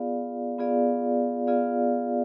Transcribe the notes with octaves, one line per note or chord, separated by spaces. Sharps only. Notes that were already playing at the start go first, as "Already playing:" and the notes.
Already playing: B3 F4 G#4 D5 F5
B3 F4 G#4 D5 F5
B3 F4 G#4 D5 F5